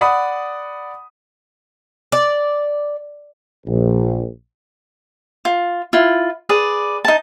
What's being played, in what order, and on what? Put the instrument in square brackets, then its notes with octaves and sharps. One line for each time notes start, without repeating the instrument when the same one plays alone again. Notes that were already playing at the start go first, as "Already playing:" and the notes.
[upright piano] D5 F#5 B5 D#6
[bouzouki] D5
[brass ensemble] A#1
[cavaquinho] F4
E4 F4
G#4 B4 D5
D#4 A5